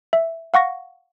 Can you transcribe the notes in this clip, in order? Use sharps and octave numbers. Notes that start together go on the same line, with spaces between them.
E5
F5 F#5 C#6 A#6